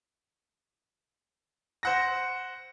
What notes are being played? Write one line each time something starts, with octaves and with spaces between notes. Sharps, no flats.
C5 F#5 A#6